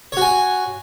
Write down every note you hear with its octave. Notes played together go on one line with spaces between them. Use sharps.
F#4 C#5 G#5